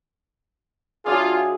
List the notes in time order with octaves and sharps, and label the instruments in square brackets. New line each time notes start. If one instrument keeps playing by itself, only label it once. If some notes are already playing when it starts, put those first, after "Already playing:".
[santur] F#3 D4 E5 [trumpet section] F4 [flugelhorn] G#4